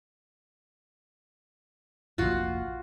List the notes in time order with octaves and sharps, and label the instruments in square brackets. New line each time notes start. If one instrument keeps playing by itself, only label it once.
[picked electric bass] F1 A#1 A#2 [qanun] F4 F#4 F#5